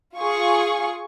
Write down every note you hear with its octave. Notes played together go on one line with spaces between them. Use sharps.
F4 G#4 C#6